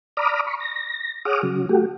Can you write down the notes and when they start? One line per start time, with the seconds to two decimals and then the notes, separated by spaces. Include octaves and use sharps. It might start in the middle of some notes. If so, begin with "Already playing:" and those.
0.17 D5 A#5 B5 D6 D#6 F6
0.47 B5 C#6
0.60 A#6
1.25 G#4 C#5 F#5 D6 D#6 F6
1.43 C#3 F#3
1.69 A3 F#4 G4